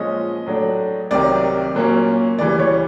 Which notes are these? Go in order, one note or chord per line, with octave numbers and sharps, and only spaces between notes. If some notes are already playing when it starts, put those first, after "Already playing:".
Already playing: A#2 F3 G#3 C#4 D#5
A2 F#3 A3 D4
C2 C3 D#3 F#3 D5
A#2 F#3 A#3 C#4
D2 C#3 E3 G3 D5
C#5